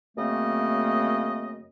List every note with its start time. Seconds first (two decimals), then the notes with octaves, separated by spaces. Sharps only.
0.16 F#2 C#3 A3 A#3 C4 D#5